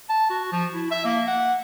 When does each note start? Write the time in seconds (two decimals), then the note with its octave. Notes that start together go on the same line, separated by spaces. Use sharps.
0.09 A5
0.30 F#4
0.52 F3
0.74 E4
0.91 E5
1.05 A#3
1.27 F#5